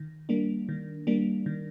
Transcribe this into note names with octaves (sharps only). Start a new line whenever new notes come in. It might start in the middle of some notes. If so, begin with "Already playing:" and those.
Already playing: D#3
G3 A#3 D4
D#3
G3 A#3 D4
D#3